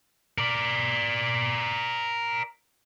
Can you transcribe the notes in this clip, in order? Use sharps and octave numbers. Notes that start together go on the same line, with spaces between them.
A#4 D5